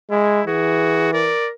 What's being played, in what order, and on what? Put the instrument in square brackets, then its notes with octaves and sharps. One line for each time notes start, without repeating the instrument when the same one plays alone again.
[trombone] G#3 [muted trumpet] E4
[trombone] E3 [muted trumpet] F#4 [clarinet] G#4
[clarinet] A#4 [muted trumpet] D5